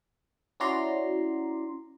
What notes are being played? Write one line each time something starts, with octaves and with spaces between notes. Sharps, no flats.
C#4 E4 F#4 D5 A#5 C6